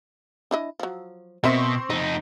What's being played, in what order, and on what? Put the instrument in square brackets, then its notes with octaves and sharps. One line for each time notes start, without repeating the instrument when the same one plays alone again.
[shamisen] D4 E4 D#5
F3 F#3
[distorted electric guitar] B2 [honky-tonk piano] C4 C6 C#6 [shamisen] A#4 D#5 E5
[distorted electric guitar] F2 D#4 [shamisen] D#5